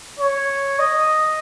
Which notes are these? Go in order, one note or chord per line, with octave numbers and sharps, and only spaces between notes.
C#5
D#5